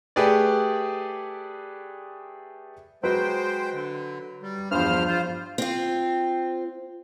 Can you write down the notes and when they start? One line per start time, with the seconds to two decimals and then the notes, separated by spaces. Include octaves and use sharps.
0.16 A3 G4 G#4 B4 D5
3.03 F#3 G#3 B4 C5 G5
3.73 D3
4.43 G3
4.71 E2 G2 F3 C5 F6
5.07 F4 C5
5.58 C4 F4